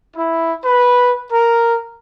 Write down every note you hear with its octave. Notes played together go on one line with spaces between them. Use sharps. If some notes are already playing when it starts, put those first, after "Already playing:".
E4
B4
A#4